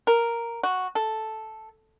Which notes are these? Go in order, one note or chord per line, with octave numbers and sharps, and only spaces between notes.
A#4
F#4
A4